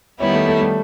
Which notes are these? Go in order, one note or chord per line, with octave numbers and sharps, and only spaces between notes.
D#3 G3 B3 C#4 E4
A3
A3
G3